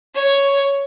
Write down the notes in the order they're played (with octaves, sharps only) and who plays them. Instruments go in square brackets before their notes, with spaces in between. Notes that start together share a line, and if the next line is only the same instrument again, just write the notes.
[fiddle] C#5